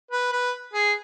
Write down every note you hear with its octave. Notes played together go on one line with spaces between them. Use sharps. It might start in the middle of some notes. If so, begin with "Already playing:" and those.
B4
B4
G#4